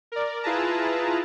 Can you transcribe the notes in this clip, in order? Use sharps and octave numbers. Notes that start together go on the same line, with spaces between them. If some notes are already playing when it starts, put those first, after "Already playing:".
A#4 D5
E4 F4 G#4 B4 A5 A#5